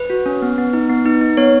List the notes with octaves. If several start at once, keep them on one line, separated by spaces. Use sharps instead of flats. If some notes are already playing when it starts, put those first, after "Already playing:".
Already playing: B4
F#4
C#4
B3
B3
D#4
B3
D#4
D#4
B3 C#5